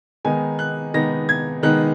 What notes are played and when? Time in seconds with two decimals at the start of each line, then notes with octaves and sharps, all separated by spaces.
0.25 D#3 G#3 B3 D#4 G#5
0.59 F#6
0.94 D#3 G#3 B3 D#4 A#6
1.29 G#6
1.63 D#3 G#3 B3 D#4 F#6